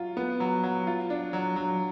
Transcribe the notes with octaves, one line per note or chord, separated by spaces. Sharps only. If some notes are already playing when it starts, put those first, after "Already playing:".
Already playing: F#3 F4
B3
F#3
F#3
F4
D4
F#3
F#3